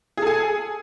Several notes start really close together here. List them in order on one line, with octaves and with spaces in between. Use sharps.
G#4 A4 G#5